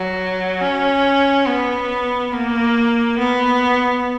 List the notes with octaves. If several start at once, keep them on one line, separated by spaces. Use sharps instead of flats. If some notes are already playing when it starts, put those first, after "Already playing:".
Already playing: F#3
C#4
B3
A#3
B3